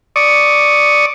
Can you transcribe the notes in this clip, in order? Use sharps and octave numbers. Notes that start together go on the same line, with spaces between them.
D5 C#6 D#6